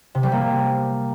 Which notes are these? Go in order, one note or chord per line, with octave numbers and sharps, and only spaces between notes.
C3
G3
A#3